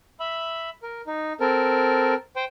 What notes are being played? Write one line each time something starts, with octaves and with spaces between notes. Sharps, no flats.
E5 B5
A#4
D#4
C4 A4 A#4
C5 G5